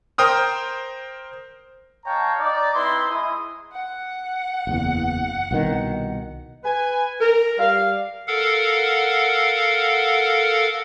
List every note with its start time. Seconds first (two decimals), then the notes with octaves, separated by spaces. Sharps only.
0.18 A#4 C5 G5 D#6 F6
2.05 G#3 C#5 F5 G5 A5 A#5
2.39 D#4 D5
2.74 C4 D#4 E4 B4 C6
3.09 G#3 E4 D#6
3.72 F#5
4.67 F#1 E2
5.51 C2 B2 D#3
6.64 B4 G#5
7.21 A#4
7.58 G3 F5
8.27 A4 A#4 F5 F#5